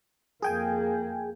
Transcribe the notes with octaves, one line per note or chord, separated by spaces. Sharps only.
F2 A#3 G#4 G5 G#5